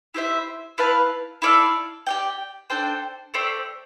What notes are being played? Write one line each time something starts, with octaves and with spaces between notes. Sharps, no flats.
E4 G4 C5 E5
E4 B4 F5 A5
E4 A4 D5 F5
G4 D5 G5
D4 A4 C5 G5
A3 C4 G4 D5